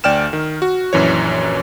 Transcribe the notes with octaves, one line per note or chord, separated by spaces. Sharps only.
D2 D5 G5 F6 E7
D#3
F#4
A#1 F#2 E3 C#5